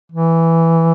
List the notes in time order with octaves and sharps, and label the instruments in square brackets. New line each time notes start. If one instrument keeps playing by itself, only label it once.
[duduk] E3